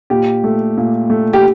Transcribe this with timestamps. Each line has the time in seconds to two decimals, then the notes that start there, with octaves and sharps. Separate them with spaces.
0.10 A#2 G4
0.44 A3
0.77 A#2
1.10 A3
1.33 G4